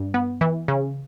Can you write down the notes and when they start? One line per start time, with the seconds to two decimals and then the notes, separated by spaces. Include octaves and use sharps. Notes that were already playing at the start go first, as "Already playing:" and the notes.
Already playing: G2
0.14 B3
0.41 E3
0.68 C#3